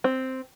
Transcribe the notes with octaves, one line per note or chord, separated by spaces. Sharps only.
C4